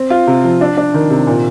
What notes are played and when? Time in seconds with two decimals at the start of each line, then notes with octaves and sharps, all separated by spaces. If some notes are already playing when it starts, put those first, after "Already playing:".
Already playing: C4
0.10 F4
0.27 C3
0.44 F3
0.61 D4
0.77 D4
0.94 D#3
1.10 C3
1.27 A#2